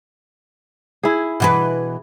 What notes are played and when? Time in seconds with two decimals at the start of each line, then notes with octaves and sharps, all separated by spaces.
1.03 E4 G#4
1.40 B2 E3 B4